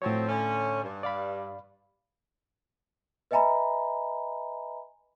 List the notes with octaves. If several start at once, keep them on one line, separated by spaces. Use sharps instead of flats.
A2 F3 F#3 C4 C#5
D3 A3 C#4
G2
D5 F5 B5
B4 D#5 E5 G#5 A#5 B5